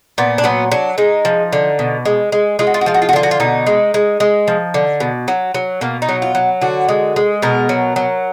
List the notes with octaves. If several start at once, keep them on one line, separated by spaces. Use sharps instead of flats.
A#2 B3
D4
F#3 B3
F#3 D4
G#3 D#4
F3
D3
B2
G#3
G#3
G#3 F4
F#4
F4
F#4
F3 F4
F#4
F4
F#4
D3 F4
F#4
F4
B2 D#4
G#3
G#3
G#3
F3
D3
B2
F#3
F#3
B2 A#3
D#4
F#3
F4
F#3
D3 F#4
G#3
G#3
B2 A#4
F#3
F#3